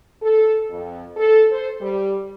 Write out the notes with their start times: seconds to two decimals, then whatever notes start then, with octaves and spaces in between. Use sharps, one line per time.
0.22 A4
0.70 F2
1.17 A4
1.51 C5
1.81 G3